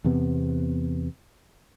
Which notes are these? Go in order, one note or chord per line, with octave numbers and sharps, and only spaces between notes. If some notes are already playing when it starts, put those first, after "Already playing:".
E2 C3 B3